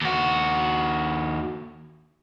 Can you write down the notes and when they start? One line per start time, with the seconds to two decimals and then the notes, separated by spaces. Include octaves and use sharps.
0.01 D#2 F#4